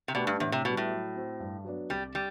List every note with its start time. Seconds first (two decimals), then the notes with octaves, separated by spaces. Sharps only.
0.08 C3
0.15 B2 A3 D4 G4 B4
0.27 G2
0.40 E2 A2
0.52 C3
0.65 B2 G3 B3 F#4
0.77 A2
0.90 F#3
1.15 C4 F#4
1.40 G2
1.64 F#3 B3 D4
1.90 C2 G3
2.15 G3